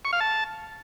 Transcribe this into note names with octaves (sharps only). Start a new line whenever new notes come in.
C#6
F5
A5